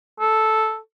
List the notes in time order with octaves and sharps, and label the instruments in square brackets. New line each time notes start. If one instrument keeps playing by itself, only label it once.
[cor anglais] A4